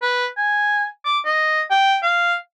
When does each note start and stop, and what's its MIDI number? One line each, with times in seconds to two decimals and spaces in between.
0.02 0.26 71
0.37 0.85 80
1.05 1.18 86
1.25 1.61 75
1.70 1.97 79
2.03 2.35 77